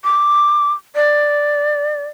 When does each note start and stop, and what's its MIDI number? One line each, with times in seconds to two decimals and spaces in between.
0.04 0.73 86
0.95 2.06 74